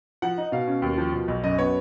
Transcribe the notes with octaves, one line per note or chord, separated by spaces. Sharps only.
F3 F#5
D#4
B2 F5
C#4
D#2
F3
B2
B1
F#2 D#5
B3 C#5